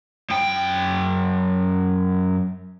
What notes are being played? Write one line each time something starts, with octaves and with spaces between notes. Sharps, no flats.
F#2 G5